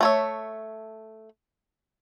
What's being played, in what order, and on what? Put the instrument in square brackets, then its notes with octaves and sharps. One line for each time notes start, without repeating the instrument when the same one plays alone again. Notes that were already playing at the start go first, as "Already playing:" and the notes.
[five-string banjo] A3 C#5 E5